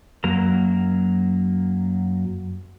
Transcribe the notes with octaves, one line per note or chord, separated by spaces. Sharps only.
F#2 F#3 A#3 A#4 A#5